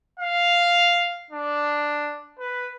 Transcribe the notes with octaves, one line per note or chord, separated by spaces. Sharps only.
F5
D4
B4